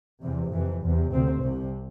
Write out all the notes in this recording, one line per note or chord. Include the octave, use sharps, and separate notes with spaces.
E2 C3
F2 C3 E3
E2 C3
D2 C3 C4
C2 C3